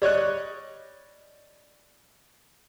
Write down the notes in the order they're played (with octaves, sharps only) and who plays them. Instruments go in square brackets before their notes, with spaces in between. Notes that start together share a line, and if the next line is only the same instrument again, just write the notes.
[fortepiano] G3 C#5 D#5 F#6